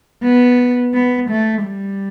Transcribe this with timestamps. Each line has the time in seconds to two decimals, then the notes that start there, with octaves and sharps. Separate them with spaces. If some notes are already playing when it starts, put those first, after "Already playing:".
0.24 B3
0.94 B3
1.30 A3
1.65 G3